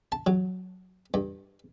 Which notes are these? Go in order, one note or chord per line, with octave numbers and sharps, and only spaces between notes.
A5
F#3
G2